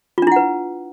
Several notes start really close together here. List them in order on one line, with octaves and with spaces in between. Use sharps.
F4 D4 E4 F#5 B4